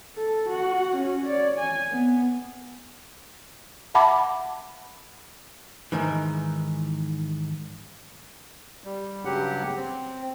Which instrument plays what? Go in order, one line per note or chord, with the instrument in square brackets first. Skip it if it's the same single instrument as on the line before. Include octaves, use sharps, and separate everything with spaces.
[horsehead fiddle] A4
F#4 F#5
C#4 F#4
C#5 D5
G#5
B3
[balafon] E5 F#5 A5 B5 D6
[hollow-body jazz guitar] G#2 D#3 E3
[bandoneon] G3
G2 C#3 F#3 G4 F#5
C4